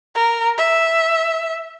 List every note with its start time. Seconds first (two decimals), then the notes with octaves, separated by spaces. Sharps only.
0.15 A#4
0.58 E5